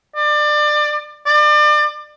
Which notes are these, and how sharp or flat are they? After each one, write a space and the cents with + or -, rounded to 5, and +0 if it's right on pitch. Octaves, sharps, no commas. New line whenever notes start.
D5 +25
D5 +35